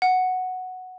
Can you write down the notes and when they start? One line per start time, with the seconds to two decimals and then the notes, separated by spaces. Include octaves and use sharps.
0.02 F#5